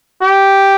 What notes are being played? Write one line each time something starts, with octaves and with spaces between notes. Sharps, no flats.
G4